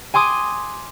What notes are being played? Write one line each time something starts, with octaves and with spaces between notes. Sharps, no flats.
G#5 C6 D6 D#6